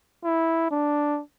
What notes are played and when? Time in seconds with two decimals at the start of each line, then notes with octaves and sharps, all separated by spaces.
0.24 E4
0.71 D4